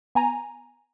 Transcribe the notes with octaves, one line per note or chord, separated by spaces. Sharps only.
B3 G#5 A#5